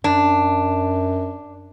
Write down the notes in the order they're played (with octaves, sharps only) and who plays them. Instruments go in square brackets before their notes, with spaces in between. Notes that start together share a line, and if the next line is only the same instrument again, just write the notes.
[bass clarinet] F#2 [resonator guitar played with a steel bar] D4